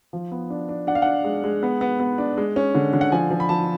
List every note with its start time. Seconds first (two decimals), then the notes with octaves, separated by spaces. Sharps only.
0.13 F3
0.32 B3
0.50 D4
0.69 D4
0.87 D4 F#5
0.95 F5
1.02 D4 F#5
1.24 G#3
1.44 G#3
1.63 B3
1.81 B3
2.00 B3
2.18 D4
2.37 G#3
2.56 C#4
2.75 D3
2.93 D3
3.01 F#5
3.12 F3 G#5
3.31 F3
3.40 B5
3.49 F3 A5